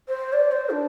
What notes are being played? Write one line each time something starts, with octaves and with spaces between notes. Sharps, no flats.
C5
D5
C5
D4